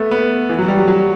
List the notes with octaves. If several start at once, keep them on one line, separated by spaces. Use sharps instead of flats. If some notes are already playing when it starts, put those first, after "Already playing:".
Already playing: A3 B3
B3
E3
F#3
G3
F#3
F#3